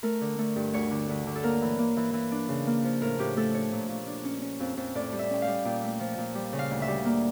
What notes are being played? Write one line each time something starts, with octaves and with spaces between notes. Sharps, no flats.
A3 A#4
D3
A3
G2
D2 C#5
D3
D2
D3
A4
A#3 A#4
E3
A#3
E3
E3
D4
C#3
A#3
F3
A2 A#4
A2 G4
A3 A4
D4 C#5
A#2
A#2
D4
C#4
C#4
F2
F2
A2 D5
G3
E5
C#4 G5
F5
G3
A#2 G5
A3
F3
A#2
G3
C#3
F5
D2
E5
G3
A#3